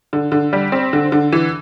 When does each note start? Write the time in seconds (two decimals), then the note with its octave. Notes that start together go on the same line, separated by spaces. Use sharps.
0.13 D3
0.32 D3
0.53 G3
0.72 C4
0.93 D3
1.12 D3
1.32 E3